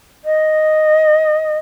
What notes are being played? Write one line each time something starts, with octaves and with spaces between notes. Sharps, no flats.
D#5